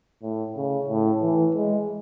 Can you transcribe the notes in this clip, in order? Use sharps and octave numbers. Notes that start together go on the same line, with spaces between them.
A2
C#3
A2
E3
G#3